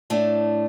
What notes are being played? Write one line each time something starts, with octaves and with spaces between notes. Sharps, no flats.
A2 A3 D4